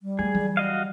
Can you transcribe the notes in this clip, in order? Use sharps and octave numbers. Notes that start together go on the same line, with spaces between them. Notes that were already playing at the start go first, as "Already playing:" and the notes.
G3
E3 A3 G#4
E3 F#3
F#4 D#5 F5